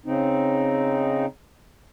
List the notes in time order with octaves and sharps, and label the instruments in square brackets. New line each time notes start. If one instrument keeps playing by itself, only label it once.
[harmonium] C#3 C4 D#4